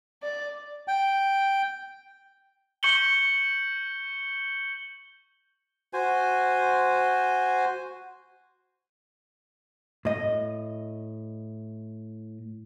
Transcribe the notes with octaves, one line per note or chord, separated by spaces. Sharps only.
D5
G5
C#6 G6 C#7 F#7 G7
F#4 C5 G#5
A2 D#5